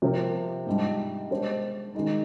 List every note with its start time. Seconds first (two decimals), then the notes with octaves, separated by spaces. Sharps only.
0.02 C3 F3 C4 G4 A#4
0.67 G#2 G3 D4
1.30 G#3 D4 G4 C5
1.95 D#3 G#3 D#4